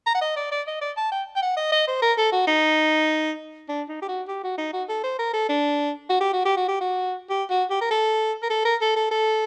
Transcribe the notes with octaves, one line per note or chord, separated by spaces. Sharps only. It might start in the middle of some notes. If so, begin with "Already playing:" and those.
A#5
F#5
D#5
D5
D5
D#5
D5
A5
G5
G5
F#5
D#5
D#5
C5
A#4
A4
F#4
D#4
D4
D#4
G4
F#4
G4
F#4
D#4
F#4
A4
C5
A#4
A4
D4
F#4
G4
F#4
G4
F#4
G4
F#4
G4
F#4
G4
A#4
A4
A#4
A4
A#4
A4
A4
A4